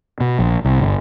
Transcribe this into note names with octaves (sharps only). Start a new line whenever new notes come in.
B2
A#1
C2
G1